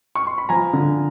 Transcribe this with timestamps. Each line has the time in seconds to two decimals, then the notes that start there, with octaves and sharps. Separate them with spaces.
0.15 C#6
0.27 C6
0.38 B5
0.49 F3 G#5 A#5
0.73 D3